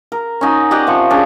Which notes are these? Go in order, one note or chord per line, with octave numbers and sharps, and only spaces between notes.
A#4
C#4 D#4 F#4
G4 D5 D#5 F#5
C3 F3 C#6
C#4 D4 G#4